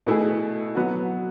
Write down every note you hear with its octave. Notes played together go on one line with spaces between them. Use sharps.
B2 A3 E4 G#4
F#3 B3 F#4